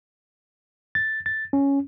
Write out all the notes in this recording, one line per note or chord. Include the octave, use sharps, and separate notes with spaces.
A6
A6
C#4